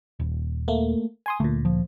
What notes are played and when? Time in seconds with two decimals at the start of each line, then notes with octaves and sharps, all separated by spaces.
0.19 D#1
0.68 A3 A#3
1.26 G#5 C6 D#6
1.40 D2 A#2 A3
1.65 F3